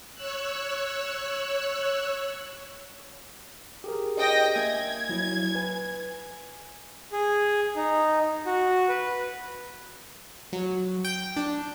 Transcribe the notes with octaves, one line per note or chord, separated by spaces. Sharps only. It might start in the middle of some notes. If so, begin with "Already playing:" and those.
C#5 E6 F#6
G4 G#4 A#4
D#5 G5 A#6
A#3 E5 G#5 G#6
F#3 E4
B4 G#5
G#4
D#4
F#4
B4
F#3
G5
D4